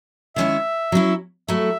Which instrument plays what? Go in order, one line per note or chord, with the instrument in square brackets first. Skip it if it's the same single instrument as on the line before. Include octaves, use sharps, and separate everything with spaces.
[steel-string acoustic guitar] D#3 G#3 C#4 E4 [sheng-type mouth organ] E5
[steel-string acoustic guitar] F#3 C#4 E4
[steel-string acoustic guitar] F#3 A3 E4 [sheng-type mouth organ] E5